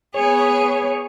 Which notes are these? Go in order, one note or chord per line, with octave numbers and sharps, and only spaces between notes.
B3 G#4 C#5